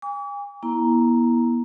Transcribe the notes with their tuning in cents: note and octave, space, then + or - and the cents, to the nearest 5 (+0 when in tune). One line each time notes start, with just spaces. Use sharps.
G#5 -40 D6 -45
B3 -40 E4 -10 A#5 +0